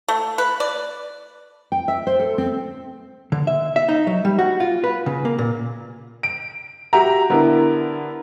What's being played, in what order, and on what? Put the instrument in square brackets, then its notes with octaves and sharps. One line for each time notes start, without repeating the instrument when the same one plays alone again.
[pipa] A3
B4
D5
[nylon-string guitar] G5
E5
C5
A4
C4
[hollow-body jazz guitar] D3
E5
E5
D#4
F#3
G3
F#4
F4
B4
C#3
A#3
A#2
[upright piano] D7
F#4 G4 E5 A#5
D3 B3 E4 A#4